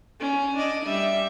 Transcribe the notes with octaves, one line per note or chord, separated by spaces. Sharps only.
C#4
D4 D#5
G3 E5